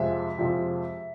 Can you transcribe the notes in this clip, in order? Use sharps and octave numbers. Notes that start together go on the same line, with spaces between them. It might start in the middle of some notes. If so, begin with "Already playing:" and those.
Already playing: F2 C3 F3 G#3 E5
F2 C3 F3 G#3